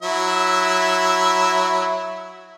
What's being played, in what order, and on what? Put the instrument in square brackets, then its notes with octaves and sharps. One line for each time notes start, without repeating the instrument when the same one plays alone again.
[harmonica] F#3 E4 E5